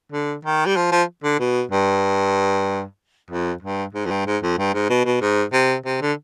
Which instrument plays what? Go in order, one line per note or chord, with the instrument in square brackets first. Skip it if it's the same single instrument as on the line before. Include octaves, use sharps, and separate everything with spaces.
[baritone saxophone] D3
D#3
G3
F3
F3
D3
B2
G2
F2
G2
G#2
F2
G2
G#2
F2
G2
G#2
B2
B2
G#2
C3
C3
D3